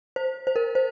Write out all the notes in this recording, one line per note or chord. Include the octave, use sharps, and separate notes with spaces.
C5
C5
A#4
C5